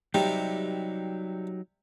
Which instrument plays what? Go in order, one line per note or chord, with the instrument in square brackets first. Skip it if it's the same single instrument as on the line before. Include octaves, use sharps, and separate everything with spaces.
[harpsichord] C3 G3 [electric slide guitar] F#3 D#4 G4